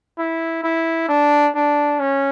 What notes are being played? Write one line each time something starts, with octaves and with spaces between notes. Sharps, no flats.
E4
E4
D4
D4
C#4